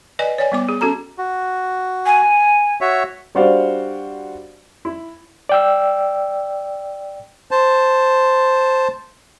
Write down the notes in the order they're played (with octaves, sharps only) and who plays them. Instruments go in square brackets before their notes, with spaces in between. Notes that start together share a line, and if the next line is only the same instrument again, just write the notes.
[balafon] B4 D5 D#5 G#5
C#5 D5 G#5
G3 B3 D6
G#4
C#4 F#4 A4 A#5
[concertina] F#4
[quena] G#5
[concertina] F#4 C#5 E5
[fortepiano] G3 D4 F#4 C5 D5 F5
E4
[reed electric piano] D5 G5 E6
[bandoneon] C5 A5